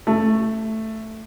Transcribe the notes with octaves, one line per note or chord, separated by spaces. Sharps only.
A3